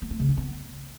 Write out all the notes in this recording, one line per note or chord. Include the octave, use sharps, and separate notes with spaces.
A#3
A3
C#3
D4
B3